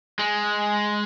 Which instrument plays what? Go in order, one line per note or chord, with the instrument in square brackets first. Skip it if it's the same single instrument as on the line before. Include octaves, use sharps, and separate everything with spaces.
[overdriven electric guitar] G#3